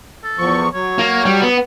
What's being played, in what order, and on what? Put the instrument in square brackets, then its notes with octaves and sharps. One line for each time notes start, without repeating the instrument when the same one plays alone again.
[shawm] A4
[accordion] E2 F3 C#6
[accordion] F#3 [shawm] C#5
[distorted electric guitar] A#3
G3
B3